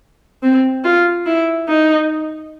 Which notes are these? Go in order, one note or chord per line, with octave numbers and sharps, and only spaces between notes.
C4
F4
E4
D#4